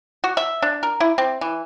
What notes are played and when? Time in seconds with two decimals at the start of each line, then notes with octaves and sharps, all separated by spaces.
0.24 F#4
0.37 E5
0.62 D4
0.83 A#4
1.00 E4
1.18 C4
1.41 E3